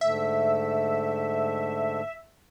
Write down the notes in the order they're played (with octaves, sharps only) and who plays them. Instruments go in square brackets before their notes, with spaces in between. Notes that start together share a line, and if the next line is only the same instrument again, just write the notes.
[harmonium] G#2 D3 A3 [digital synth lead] E5